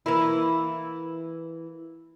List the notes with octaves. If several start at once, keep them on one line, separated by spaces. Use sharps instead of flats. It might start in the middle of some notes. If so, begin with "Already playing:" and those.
E3 A#3 E4